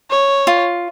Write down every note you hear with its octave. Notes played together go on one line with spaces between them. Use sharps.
C#5
F4